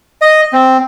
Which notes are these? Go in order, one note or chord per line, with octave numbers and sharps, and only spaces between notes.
D#5
C4